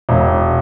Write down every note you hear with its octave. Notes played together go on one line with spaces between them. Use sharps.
E1